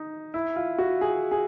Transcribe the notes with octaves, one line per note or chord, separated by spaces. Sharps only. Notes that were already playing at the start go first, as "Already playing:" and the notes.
Already playing: D#4
E4
F4
F#4
G#4
G#4